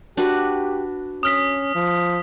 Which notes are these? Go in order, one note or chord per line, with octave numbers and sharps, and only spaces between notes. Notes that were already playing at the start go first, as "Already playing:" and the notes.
D4 F#4 G4 B4
C#4 D#6 F6 B6
F3